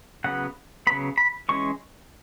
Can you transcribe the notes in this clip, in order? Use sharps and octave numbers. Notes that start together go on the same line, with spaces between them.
C#3 F#3 B3 F#5
C#3 F#3 B3 B5
B5
E3 G#3 C#4 C#6